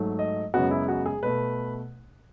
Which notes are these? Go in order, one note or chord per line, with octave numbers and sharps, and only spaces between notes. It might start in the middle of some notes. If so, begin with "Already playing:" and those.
Already playing: G#2 F#3 A3
D#5
F#2 C#3 G#3 B3 F#4
E4
F#4
G#4
B2 A3 B4